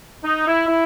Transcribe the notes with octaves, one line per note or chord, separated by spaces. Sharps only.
D#4
E4
E4